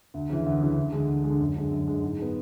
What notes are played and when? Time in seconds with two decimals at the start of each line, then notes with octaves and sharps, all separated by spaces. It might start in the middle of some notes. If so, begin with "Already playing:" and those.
0.14 D2
0.30 C#3 E3
0.46 D2
0.61 C#3 E3
0.77 D2
0.92 D3 G#3
1.08 D2
1.24 G#3
1.30 D3
1.40 F#2
1.57 D3 G#3
1.72 F#2
1.88 D3 G#3
2.04 G#2
2.19 G#3 B3